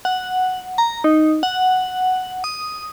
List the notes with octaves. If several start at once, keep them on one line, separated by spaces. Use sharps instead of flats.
F#5
A#5
D#4
F#5
D#6